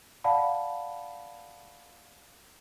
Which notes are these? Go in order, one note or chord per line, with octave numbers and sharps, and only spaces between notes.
D5 F5 F#5 A5 B5